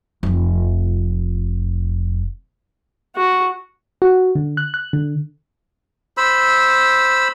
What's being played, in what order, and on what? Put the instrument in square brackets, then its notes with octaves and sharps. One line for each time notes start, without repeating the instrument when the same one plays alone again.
[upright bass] F1 F2
[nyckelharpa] F#4
[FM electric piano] F#4
D3
F#6
F#6
D3
[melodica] C5 B5 E6